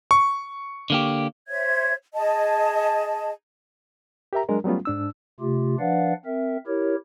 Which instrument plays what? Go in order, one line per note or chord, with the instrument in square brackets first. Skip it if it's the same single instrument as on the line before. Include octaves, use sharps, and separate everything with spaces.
[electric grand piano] C#6
[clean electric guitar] D3 A#3 G4
[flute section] C5 C#5 E5 G#6
G#4 D#5 A5
[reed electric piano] G4 A#4 E5 A#5
F#3 G#3 D4 A#4
F#3 G3 A3 B3 C#4 F4
G#2 D4 E6
[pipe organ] C3 A3 F4 G4
F3 D4 B4 D5 F5 F#5
C4 A#4 E5
E4 G4 A#4 C#5